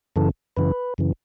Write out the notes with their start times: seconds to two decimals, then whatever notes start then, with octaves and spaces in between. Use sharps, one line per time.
0.16 F#2 C#3 E3 A4
0.57 F#2 C#3 E3 B4
0.98 F#2 C#3 E3